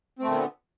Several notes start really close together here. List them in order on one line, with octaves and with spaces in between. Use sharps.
C4 A3 A#2 D3 B3